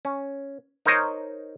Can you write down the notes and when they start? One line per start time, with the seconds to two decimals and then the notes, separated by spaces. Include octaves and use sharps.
0.05 C#4
0.86 D#4 A#4 C5 C#5 D#5